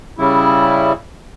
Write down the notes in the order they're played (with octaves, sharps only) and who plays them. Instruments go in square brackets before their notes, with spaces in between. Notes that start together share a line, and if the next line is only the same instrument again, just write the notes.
[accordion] C#3 G3 E4